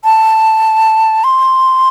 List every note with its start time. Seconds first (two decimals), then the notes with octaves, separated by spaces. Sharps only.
0.04 A5
1.24 C6